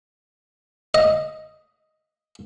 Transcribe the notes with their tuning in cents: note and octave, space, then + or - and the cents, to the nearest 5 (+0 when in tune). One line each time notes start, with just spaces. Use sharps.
D#5 +5